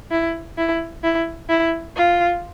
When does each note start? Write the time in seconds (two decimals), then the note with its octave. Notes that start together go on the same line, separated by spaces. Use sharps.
0.11 E4
0.58 E4
1.04 E4
1.49 E4
1.96 F4